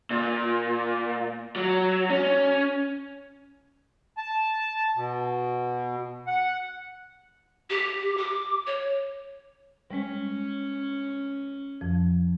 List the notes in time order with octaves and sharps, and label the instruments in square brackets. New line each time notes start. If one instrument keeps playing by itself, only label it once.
[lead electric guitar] A#2
F#3
C#4
[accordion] A5
B2
F#5
[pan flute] G4
D6
C#5
[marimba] G3 G#3 [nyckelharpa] C#4
[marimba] F2 F3